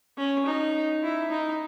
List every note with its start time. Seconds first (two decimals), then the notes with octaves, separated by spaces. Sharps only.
0.17 C#4
0.46 D#4
1.03 E4
1.31 D#4